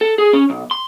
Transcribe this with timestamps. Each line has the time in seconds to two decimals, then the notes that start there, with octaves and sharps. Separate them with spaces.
0.01 A4
0.18 G#4
0.33 C#4
0.50 B1
0.71 C6